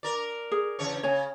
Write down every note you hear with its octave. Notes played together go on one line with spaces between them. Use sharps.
A#4 D5
G#4
E2 C#3 C#5
C#3 C#5 G#5